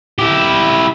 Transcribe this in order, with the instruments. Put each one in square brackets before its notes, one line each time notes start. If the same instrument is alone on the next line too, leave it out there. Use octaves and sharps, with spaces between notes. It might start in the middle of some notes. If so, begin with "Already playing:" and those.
[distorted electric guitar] E4 G4